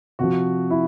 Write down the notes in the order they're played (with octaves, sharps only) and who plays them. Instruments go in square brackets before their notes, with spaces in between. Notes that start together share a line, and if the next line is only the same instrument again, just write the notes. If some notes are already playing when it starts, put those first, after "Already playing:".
[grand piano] C3 F3 F#4
E4